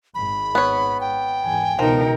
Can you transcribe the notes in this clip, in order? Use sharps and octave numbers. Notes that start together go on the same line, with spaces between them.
G#1 G#2 B5
B3 C#5
G5
E2 G#2 G#5
C#2 B2 E3 F3 D#4 A#4